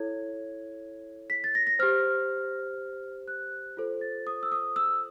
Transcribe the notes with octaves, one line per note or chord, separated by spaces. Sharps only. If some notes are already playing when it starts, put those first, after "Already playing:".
Already playing: E4 A4 C#5 G#6
B6
A6
A#6
A#6
G4 C5 F6
F#6
F4 A4 C5
A6
D#6
E6
D#6
E6